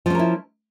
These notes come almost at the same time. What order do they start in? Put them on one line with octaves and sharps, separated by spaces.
F3 C#4 A#4 E4